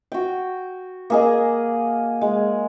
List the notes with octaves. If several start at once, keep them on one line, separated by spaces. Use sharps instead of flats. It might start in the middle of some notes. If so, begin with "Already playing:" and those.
F#4 G5
A#3 G#4 D#5
G#3